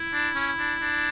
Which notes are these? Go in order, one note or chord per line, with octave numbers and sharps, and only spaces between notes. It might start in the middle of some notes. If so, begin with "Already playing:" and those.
Already playing: E4
D4
C#4
D4
D4